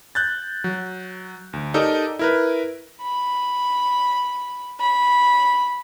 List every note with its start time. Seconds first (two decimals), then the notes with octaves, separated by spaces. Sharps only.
0.15 F#6 G6 A6
0.64 F#3
1.53 D2
1.74 D#4 G4 A4 A#4 D5 D#5
2.19 E4 A#4 B4
3.03 B5
4.80 B5